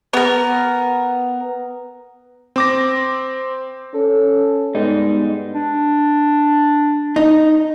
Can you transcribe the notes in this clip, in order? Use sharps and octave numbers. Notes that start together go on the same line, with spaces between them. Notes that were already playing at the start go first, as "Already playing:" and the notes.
B3 A#4
C4 D6 A#6
C#4 A4
G#2 G3 B3 D#4
D4
D#4